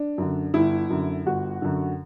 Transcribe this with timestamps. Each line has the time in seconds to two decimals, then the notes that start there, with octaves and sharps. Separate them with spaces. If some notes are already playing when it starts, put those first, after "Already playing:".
Already playing: D4
0.18 F#2 D3
0.54 G1 E4
0.90 F#2 D3
1.26 G1 F#4
1.62 F#2 D3